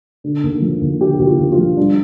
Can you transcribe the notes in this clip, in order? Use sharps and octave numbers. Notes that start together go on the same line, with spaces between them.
D3
D#2
F3
D#2
D3 G4
D#2 G4
F4
D#2
F4
F3
G3 D4